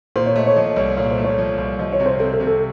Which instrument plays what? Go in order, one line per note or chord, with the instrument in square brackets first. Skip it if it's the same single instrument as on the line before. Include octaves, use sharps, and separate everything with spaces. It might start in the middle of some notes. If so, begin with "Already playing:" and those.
[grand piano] A#2 [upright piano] C5
[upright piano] C#5
[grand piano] A3 [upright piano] D#5
[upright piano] C#5
[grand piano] F3 [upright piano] D#5
[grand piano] C2 [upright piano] C#5
[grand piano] A#2 [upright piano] C#5
[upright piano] C5
[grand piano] A3
[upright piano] C#5
[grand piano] F3
C2
[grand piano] F3 [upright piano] D#5
[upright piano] C#5
[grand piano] C3
[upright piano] C5
[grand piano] C4 [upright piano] A4
[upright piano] A4
[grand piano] C3
[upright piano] A4